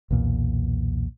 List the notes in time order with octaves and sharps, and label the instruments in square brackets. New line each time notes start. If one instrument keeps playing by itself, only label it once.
[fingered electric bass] B1 E2 A#2